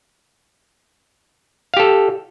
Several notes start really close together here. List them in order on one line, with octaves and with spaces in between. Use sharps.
F5 G4 A4